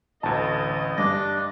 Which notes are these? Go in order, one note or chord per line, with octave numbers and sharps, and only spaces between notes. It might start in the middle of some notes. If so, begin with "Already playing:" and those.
A1 D2 D#5 A5
G2 D4 A#6